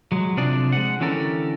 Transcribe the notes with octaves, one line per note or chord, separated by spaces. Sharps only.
F#3 G#3
C3 F3 D4 G#4 D5
G#3 F#5
D3 E3 C#4 G4 A4 A#4